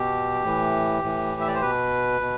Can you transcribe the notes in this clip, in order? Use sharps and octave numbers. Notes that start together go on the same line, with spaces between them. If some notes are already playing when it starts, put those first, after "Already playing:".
Already playing: B2 G4
A2 E3
A2 E3
E5
D5
C5
B2 B4
B2